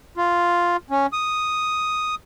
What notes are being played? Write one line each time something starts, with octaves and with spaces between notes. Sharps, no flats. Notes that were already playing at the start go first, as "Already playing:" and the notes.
F4
C#4
D#6